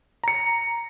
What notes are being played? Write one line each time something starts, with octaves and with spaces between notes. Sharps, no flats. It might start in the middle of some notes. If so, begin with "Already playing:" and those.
A#5 C#7